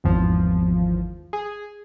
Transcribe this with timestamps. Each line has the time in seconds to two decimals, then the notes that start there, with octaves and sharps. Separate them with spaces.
0.04 G#1 E2 F3
1.33 G#4